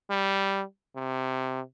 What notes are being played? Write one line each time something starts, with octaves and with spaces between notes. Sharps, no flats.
G3
C3